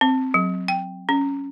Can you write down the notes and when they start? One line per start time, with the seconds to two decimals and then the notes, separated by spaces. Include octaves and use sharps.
0.01 C4
0.34 F#3
0.68 G5
1.09 C#4